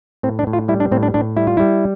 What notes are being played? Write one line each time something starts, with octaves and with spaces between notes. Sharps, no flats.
A2 C4
D4
A2
F4
G3 E4
D4
A2 C4
D4
A2 D4
G3 E4
F4
G3 E4